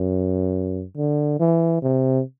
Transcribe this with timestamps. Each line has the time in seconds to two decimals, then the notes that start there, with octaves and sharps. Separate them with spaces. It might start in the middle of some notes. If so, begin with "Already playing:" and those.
Already playing: F#2
0.97 D3
1.40 E3
1.82 C3